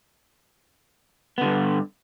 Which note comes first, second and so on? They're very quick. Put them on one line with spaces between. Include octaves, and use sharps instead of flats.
B3 D3 G2